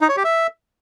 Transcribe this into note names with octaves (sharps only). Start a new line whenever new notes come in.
D#4
C#5
G4
E5